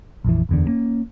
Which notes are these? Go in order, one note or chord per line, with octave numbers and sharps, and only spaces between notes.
A#1 F2 E3
F#1 E2 D3
A#3 C#4